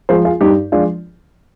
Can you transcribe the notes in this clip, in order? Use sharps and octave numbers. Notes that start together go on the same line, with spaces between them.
F3 G#3 G#4 C5
F4 G#4
G2 D#4 G4
F3 G#3 D4 F4